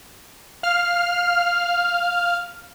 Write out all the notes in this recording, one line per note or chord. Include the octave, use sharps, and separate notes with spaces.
F5 F6